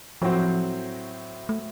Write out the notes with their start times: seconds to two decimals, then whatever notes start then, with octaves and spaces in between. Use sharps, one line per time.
0.22 A2 F3 F#3 C4 F#4 C5
1.49 A3